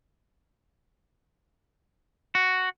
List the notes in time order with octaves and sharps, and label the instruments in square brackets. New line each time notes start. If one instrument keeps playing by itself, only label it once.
[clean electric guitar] F#4